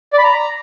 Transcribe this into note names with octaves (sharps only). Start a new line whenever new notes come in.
D5
B5
A#5